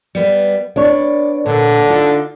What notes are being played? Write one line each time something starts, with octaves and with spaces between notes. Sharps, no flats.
G3 B3 B4
B3 D4 C#5 D5
A#2 D3
D#4 F4